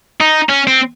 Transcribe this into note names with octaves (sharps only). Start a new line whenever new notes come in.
D#4
C#4
C4